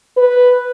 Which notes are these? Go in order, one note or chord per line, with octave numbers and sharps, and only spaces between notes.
B4